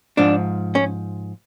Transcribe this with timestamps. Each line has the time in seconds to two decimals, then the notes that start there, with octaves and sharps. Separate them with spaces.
0.17 G#2 F3 D4
0.75 C#4